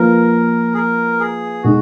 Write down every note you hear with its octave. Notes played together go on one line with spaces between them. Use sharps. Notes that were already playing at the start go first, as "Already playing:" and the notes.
Already playing: F3 A#3 F4 A#4 B4
G#4
A#4
G#4
B2 G#3 D#4 F#4